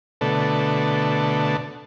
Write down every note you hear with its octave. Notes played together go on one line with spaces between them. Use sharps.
B2 D3 A3